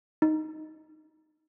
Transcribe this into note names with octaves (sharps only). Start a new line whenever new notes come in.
D#4